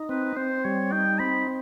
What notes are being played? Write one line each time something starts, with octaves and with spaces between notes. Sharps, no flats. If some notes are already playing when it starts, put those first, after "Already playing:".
Already playing: D#4
C4 B4
C4 C5
G3 C#5
D#4 G5
C4 B5